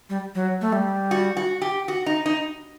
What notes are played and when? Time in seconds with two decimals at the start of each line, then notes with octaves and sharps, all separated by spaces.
0.09 G3
0.35 F#3
0.61 A3
0.73 G3
1.11 F#4
1.37 F#4
1.62 G4
1.88 F#4
2.06 D#4
2.26 D#4